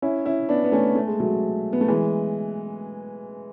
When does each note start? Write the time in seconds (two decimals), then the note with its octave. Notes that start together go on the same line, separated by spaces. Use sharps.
0.02 C#4 E4
0.26 C#4 E4
0.49 B3 D4
0.64 B3
0.72 A3 C#4
0.95 A3
1.07 G#3
1.20 F#3 A3
1.73 B3
1.81 A3
1.88 E3 G#3